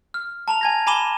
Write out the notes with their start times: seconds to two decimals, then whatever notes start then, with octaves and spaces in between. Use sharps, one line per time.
0.14 F6
0.48 A5 A#5 F7
0.61 G#5 G#6 A#6
0.87 G#5 A#5 B5 D6 E7 G7